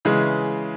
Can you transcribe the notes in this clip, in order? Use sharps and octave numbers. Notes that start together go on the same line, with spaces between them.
C#3 E3 G#3 G#4